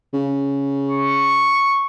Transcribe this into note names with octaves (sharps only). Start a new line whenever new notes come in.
C#3
C#6